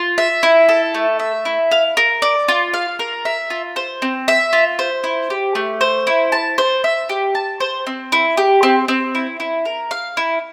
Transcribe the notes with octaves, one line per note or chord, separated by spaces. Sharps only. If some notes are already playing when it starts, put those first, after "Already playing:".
Already playing: F4
E5
E4
A4
A3
E5
E4
F5
A#4
D5
F4
F5
A#4
E5
F4
C5
C4
E5
F4
C5
E4
G4
A3
C5
E4
A5
C5
E5
G4
A5
C5
C4
E4
G4
C4
C4
E4
E4
A#4
F5
E4